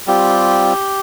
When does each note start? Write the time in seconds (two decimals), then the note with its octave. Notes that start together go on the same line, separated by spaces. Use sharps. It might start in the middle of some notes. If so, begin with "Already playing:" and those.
0.07 G3 C4 F4 G4